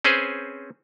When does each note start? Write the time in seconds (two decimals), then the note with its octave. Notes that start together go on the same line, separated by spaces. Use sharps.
0.05 C4 C#4 G#4 B4 C5